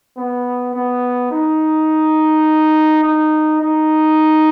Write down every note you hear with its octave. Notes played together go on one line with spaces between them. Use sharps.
B3
B3
D#4
D#4
D#4